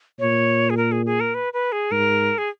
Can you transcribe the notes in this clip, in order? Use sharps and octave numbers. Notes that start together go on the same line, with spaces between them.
A#2 C#5
G#4
A#4
G#4
G#4
A#4
B4
B4
G#4
G#2 A#4
G#4